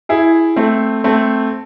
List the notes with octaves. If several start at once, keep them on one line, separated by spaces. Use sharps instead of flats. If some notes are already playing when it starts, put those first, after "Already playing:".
E4 G#4
A3 C4
A3 C4